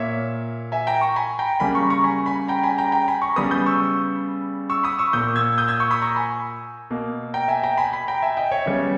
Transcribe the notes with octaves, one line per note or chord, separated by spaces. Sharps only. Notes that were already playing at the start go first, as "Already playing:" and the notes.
Already playing: A#2 A#3 C#5 E5
E5 G#5
G5 A#5
A#5 C#6
G#5 B5
G5 A#5
C#3 G3 A#3 G#5 B5
A#5 C#6
A#5 C#6
G#5 B5
G#5 B5
G5 A#5
G#5 B5
G5 A#5
G5 A#5
G#5 B5
A#5 C#6
C#3 G3 B3 B5 D#6
D#6 G6
C#6 E6
C#6 E6
B5 D#6
C#6 E6
A#2 A#3 D#6 G6
E6 G#6
D#6 G6
E6 G#6
C#6 E6
B5 D#6
A#5 C#6
G#5 B5
B2 A#3
G5 A#5
E5 G#5
G5 A#5
G#5 B5
G#5 B5
G5 A#5
E5 G#5
D#5 G5
C#5 E5
C#3 G3 B3 C#5